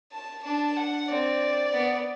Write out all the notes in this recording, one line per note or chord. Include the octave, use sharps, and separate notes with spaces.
A5
D4 A5
F#5
C4 D5
B3